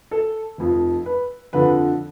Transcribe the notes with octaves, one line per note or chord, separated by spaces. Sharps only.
A4
F1 F2 F3
B4
F2 D3 F3 B4